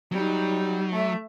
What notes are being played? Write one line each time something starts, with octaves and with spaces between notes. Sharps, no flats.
F#3 G3 D#4
A3 E5